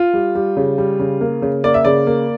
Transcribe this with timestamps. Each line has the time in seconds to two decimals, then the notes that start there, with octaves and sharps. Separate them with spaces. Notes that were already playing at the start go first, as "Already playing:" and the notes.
Already playing: F4
0.13 G3
0.35 G3
0.57 C#3
0.78 G3
0.99 C#3
1.21 A#3
1.42 C#3
1.64 A#3 D5
1.74 E5
1.85 C#3 D5
2.07 A#3